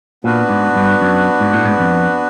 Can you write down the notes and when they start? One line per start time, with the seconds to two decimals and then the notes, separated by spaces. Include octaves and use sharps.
0.24 A#2 B3 D4 F#4 B4
0.50 G#2
0.76 G2
1.01 F#2
1.40 G#2
1.53 A2
1.65 G#2
1.79 F2